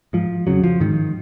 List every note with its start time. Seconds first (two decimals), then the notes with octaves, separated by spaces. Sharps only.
0.13 G#2 F3
0.47 F2 C#3 F#3
0.64 F3
0.80 G#2 D#3